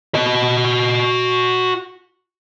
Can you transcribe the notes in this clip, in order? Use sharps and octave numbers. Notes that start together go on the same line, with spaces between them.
F#4 D#5